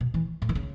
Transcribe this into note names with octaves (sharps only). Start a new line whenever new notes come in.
B2
E3
A2
E3
C#3